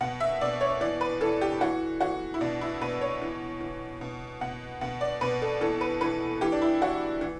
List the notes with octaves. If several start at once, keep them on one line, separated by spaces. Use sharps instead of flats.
B2 F#5
E5
B2 D5
C#5
E3 D5
B4
E3 A4
G4
E3 F#4
E3 F#4
E4
B2 D4
E4
B2 B4
C#5
E3
E3
B2
B2 F#5
B2 F#5
D5
B2 B4
A4
E3 A4
B4
E3 B4
E3 G4
D4
E4
E3 F#4
E3